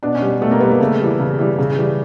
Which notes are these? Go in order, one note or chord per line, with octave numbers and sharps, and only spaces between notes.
B2 D4
C#4
G3
B2 A3
A#3
G3 B3
A#3
C#3 A3
E3 G3
C#3
E3 G3
C#3
E3 G3